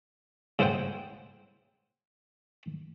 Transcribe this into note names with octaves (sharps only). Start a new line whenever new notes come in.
C#3 E4 C5 F#5 G5